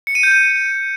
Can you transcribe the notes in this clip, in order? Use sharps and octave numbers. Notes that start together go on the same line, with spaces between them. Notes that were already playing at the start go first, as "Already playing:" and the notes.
C#7
D#7
G6
D#7